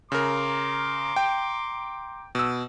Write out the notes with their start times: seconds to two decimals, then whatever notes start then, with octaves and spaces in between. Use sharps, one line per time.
0.12 C#3 A#4 A#5 C6 D6
1.16 G5
2.35 B2 E6